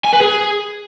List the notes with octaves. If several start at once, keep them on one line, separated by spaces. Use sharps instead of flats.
G#5
B4
G#4